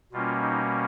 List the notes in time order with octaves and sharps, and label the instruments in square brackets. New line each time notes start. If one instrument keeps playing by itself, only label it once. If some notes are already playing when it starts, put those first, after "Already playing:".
[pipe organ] B2 G3 A#3 C#4 F4
D#4